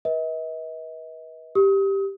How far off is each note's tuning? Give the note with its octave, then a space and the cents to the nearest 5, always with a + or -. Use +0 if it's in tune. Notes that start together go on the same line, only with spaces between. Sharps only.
B4 -30 D#5 +45
G4 +0 D#6 +35